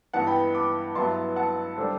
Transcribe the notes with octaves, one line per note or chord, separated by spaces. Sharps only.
G2 E3 B3 F#5 A5
G5 B5
B5 D6
G2 F#3 B3 E4 A5 C6
F#5 A5
D3 G3 D4 A4 C5